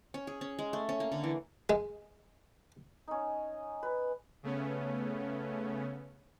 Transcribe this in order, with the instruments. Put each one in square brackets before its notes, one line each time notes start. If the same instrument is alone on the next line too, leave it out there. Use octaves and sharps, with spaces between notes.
[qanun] C#4
G#4
C#4
G#3
A3
C#4
A#3
D3
E3
[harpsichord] G#3
[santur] C#4 D#4
B4
[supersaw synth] C#3 A3 B3 C#4